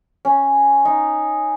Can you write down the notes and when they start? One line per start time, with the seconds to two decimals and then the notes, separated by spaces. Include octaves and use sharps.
0.25 C#4
0.85 D#4